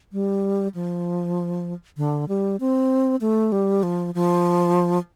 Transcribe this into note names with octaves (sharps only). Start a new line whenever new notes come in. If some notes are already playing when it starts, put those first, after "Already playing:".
G3
F3
D3
G3
C4
A3
G3
F3
F3